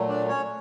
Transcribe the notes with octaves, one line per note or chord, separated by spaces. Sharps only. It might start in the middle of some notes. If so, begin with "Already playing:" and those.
Already playing: A#2 F#3 A3
D4 D5
C#4 C#5